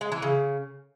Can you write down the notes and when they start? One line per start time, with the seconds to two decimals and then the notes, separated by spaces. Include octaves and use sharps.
0.01 G#3
0.12 E3
0.22 C#3